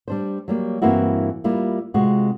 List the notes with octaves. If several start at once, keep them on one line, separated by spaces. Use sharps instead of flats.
G3 D4 C5
F#3 G3 A#3
G2 E3 A#3 C4 E4 F#4
G3 A#3 E4 F4
C3 G#3 C4 F4 F#4